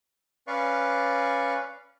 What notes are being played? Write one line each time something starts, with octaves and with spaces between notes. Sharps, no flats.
C#4 B4 D5 F5 C#6